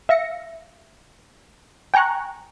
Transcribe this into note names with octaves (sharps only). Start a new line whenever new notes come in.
E5 F5 A#6 C#7
G5 G#5 A#5 C#6 F#6